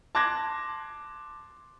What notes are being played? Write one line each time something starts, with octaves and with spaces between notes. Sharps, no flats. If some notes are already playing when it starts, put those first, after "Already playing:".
A5 C6 D6 F#6 G#6 A#6